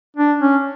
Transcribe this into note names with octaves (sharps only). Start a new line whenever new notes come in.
D4
C#4